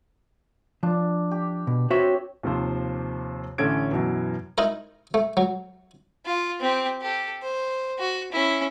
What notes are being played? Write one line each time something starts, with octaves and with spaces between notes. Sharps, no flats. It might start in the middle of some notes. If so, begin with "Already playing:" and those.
F3 D4
G4
B2
C4 F#4 C#5 E5 G5
D#2 C3 F3 C5
A1 D3 C#4 A4 G#6 D7
F#2 B2 E3
D#4 E4 A#4
A3
F#3
F4
C4 G4
G4 A4
C5
F#4
C#4 E4